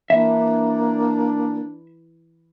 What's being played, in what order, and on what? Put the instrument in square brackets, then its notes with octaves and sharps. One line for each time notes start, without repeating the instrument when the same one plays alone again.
[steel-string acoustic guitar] E3 [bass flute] A#3 [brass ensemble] D4 [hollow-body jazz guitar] E5